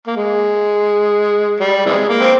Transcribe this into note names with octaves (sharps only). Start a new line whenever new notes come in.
A#3
G#3
G3
C3 E3 G#3
A#3
C4